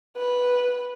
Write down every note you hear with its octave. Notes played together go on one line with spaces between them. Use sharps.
B4